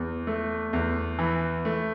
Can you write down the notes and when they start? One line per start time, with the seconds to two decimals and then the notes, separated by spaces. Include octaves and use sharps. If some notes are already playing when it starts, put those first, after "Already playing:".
Already playing: E2
0.27 A3
0.73 E2
1.19 E3
1.65 A3